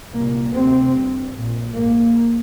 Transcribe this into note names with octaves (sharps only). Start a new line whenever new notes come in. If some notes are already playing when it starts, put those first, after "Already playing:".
C2 A#2 A#3
D2 C3 C4
G1 G2
A#1 A#2
A#1 G#2 A#3